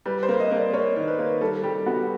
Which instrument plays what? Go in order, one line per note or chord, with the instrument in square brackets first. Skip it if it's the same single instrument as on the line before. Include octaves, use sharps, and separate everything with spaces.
[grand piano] G3 [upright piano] B4
[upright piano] C5
[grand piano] A#3
[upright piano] D#5
[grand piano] A#3 [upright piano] D5
[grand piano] A#3 [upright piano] C#5
[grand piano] D#3
[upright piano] B4
[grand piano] A#3
[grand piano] G3 [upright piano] A4
[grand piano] G3 [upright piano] G4
[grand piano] B3 [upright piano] F#4